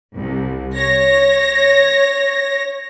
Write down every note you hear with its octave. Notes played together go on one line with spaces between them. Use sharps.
C2
C#5 A#6